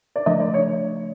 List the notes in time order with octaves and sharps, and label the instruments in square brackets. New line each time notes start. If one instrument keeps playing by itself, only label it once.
[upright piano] D5
[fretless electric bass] C#3 F3 A3 D4 [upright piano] D#5
[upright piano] D5
C#5